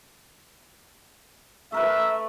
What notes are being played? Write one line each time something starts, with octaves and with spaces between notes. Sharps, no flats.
A3 A#4 B4 E5